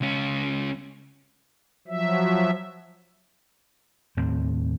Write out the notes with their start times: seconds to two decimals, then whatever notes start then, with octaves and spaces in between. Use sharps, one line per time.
0.01 C#2 C#4
1.88 F3 F#3 E5
4.17 D#2 A2 C4